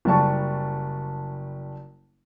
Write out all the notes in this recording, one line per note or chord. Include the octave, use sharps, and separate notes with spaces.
F#1 G3 A5 C#6